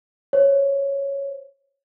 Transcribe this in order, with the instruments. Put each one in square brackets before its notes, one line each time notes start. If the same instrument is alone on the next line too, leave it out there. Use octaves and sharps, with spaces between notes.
[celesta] C5 C#5